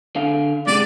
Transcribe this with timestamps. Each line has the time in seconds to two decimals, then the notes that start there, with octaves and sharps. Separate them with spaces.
0.16 D3 F5
0.67 G#2 C3 G#3 D5